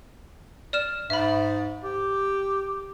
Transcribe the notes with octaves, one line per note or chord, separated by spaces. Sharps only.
D5 F6 E7
G#2 E5 B5
G4